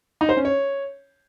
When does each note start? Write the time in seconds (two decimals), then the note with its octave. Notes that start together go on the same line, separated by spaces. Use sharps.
0.21 D#4
0.29 C5
0.37 C#4
0.45 C#5